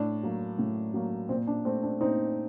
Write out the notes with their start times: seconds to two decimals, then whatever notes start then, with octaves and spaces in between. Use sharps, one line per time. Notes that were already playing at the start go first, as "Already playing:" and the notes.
Already playing: A2 D4
0.23 F#3 A#3
0.58 A2
0.94 F#3 A#3
1.29 A#2 C4
1.47 D4
1.65 A3 C4
1.83 D4
2.00 A#2 C4 D#4